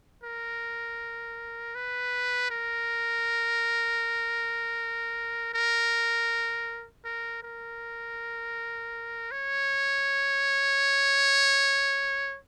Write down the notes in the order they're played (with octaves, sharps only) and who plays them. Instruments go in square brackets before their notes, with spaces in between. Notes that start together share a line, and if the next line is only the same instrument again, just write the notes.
[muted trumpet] A#4
B4
A#4
A#4
A#4
A#4
C#5